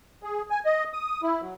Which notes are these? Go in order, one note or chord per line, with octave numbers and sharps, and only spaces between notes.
G#4
G#5
D#5
D#6
E4
F#3